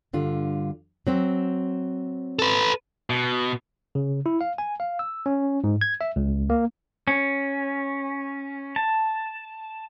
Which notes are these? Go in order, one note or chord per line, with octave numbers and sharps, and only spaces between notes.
G2 D3 F4
F#3 C4 C5
A4 B4
B2
C#3
E4
F5
G#5
F5
E6
C#4
G#2
G#6
E5
C#2
A#3
C#4
A5